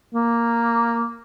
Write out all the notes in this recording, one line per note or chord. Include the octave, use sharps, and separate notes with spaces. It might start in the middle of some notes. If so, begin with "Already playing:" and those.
A#3